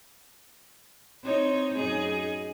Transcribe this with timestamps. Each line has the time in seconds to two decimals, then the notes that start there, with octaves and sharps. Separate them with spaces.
1.24 C4 D#4 C#5
1.77 F#2 D#4 G#4